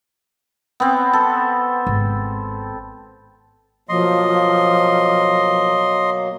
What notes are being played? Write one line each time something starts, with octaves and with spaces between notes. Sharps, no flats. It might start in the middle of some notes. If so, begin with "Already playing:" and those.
B3 C4
A4
G#1
B2 F3 F#3 A#3 D#5 C6